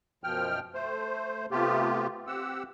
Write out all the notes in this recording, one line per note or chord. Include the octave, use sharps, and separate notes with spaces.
F#2 B2 F3 G5 F6
A3 C5
C3 A3 B3 F4 G4
C4 G4 F#5 E6